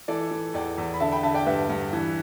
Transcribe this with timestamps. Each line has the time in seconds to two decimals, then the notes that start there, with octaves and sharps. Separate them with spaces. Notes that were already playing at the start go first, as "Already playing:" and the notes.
0.08 E3 A4 D5
0.31 E3
0.54 E2 D5 G5
0.78 E2
0.94 B5
1.00 D3 E5 A5
1.12 G5 B5
1.23 D3 E5 A5
1.34 D5 G5
1.46 G2 B4 E5
1.69 G2
1.93 E3